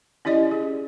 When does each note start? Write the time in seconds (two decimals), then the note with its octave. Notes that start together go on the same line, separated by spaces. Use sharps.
0.25 C#4 E4 G4 D5 D#5
0.51 G#4